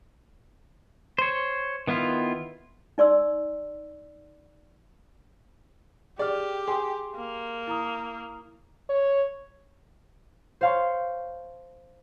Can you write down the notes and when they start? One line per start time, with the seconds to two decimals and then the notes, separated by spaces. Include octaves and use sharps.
1.18 C5 C#5
1.87 D#3 B3 E4 F4
2.98 D#4 D5 C6 E6
6.19 G4 G#4 D5 G5 F6
6.67 G#4 C6
7.15 A#3
7.67 E4 A#5 D#6
8.89 C#5
10.61 C5 C#5 F5 A5 C6 C#6